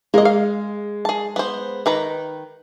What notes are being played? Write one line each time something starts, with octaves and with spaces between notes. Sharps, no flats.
G#3 A#3 D#5
F5
G#4 A5
B3 C5
D#3 B4 A#5